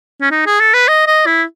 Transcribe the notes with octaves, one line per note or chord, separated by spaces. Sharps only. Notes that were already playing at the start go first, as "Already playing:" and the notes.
C#4
D#4
G#4
A4
B4
D#5
D#5
E4